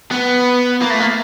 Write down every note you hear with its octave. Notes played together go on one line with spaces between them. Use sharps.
B3
A#3
A3
A#3